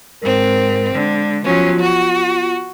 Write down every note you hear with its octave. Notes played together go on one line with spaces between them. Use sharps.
G#2 C4 A#4
D3 G#3
F3 F#3 B3 C#4 F4
F#4